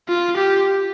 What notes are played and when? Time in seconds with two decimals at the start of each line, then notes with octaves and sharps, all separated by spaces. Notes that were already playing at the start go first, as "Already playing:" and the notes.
0.08 F4
0.37 G4